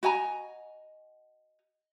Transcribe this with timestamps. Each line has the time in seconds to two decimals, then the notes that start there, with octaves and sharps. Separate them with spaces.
0.03 F#4 D#5 G#5 A#5